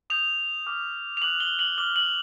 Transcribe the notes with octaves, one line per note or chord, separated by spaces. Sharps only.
D#6 G6 F7
D6 F6
F7
D6 F#6 F#7
G7
F#7
D6 F6 G7
F#7